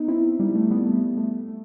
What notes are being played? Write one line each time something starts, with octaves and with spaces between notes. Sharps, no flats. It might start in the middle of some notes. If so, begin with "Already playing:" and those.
Already playing: B3 D#4
C4 E4
G3
A3
G3 B3
A3
A3
A3